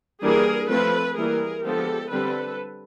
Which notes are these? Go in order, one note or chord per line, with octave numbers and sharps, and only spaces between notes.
E3 G3 A#3 D4 G#4 A#4
F3 A3 C4 A4 B4
E3 G3 A#3 G#4 A#4
D3 F3 G#3 B3 G4 A4
D3 G3 C4 A4 B4